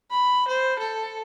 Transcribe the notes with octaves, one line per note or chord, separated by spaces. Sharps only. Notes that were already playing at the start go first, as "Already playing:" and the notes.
B5
C5
A4